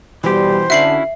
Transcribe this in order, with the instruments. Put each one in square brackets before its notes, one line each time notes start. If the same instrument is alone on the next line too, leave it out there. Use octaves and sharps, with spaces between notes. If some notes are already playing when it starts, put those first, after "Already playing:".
[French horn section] B2 G3 [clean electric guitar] E3 G4 [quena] C5
[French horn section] D3 [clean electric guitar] C#4 E4 F#4 [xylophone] E5 C7 F#7